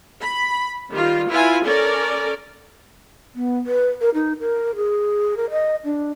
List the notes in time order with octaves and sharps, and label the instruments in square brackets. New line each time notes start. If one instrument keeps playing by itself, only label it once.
[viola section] B5
D#3 G3 F4
E4 F4 B4 G#5
C#4 A4 A#4 D5
[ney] B3
B4
A#4
D#4
A#4
G#4
A#4
D#5
D4